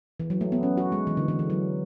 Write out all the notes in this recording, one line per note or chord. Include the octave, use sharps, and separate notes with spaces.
E3
F#3
A3
B3
C#4
F#4
G#3
E3
D3
E3
E3
F#3